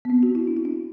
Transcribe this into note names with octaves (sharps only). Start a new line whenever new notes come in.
B3
C4
F#4
E4
D4
E4
D4